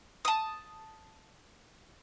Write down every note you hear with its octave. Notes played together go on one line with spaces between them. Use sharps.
A5 D#6